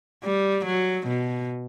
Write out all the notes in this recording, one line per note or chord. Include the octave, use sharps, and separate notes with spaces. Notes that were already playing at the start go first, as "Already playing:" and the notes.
G3
F#3
B2